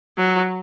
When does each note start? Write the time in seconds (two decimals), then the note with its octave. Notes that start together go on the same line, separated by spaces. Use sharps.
0.18 F#3